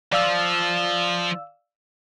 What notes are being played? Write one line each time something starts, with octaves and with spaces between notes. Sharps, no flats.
F3 D5 F5 E6